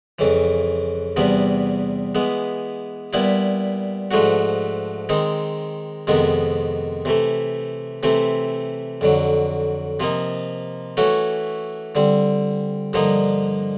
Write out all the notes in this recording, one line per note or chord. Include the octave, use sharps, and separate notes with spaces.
F2 C#3 E3
E2 C3 E3 G3 B3
E3 G#3 B3
A#2 G3 B3 E4
G#2 F3 A3 D4 F#4
D#3 G#3 C4 D#4
F2 C3 D#3 G#3 B3
C3 E3 A3
C3 E3 A3 C4
F2 D3 F#3
C3 F3 A#3 D#4
E3 A3 C#4 F#4
D3 G3 C4
G2 D3 F3 A#3 D#4